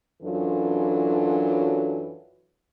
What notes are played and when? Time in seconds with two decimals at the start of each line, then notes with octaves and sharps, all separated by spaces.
0.23 F#2 E3 F#3 D4 F4 A4